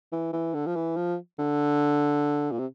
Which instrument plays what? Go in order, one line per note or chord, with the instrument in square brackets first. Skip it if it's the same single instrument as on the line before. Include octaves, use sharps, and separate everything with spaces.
[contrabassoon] E3
E3
D3
F3
E3
F3
D3
A#2
C3